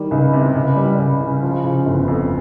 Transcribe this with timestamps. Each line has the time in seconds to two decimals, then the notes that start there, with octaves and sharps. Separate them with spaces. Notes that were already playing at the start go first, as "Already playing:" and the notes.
Already playing: D#3 G3
0.11 C#2
0.33 C3
0.55 C#2
0.76 G3
0.98 C#2
1.21 C#3
1.42 F3
1.64 C#3
1.86 G1
2.08 F2